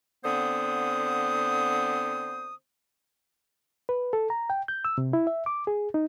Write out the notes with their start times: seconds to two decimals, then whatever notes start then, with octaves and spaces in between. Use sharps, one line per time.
0.25 D3 B3 C4 C5 D#6
3.89 B4
4.13 A4
4.30 A#5
4.50 G5
4.68 G6
4.85 E6
4.98 C3
5.13 E4
5.27 E5
5.46 D6
5.67 G#4
5.94 D#4